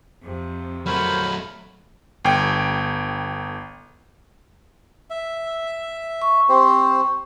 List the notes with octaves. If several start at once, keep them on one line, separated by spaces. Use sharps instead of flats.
F2 C3
F#3 A3 A#4 C5 C#5 B5
G1 G5
E5
C#6
C4 G4 C5